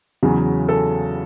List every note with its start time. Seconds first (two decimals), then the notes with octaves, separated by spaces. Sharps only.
0.23 E2 C#3 F#3
0.69 A4